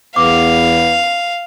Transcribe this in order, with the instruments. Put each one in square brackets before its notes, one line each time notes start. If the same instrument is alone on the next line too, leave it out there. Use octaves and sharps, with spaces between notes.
[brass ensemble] E2 B3 [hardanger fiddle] F5 [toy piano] D6